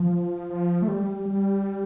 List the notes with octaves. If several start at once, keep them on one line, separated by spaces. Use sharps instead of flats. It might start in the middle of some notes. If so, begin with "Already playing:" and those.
Already playing: F3
F3
A3
G3
G3